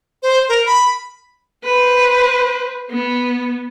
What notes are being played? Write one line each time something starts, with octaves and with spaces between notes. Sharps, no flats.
C5
A#4
B5
B4 C5
B3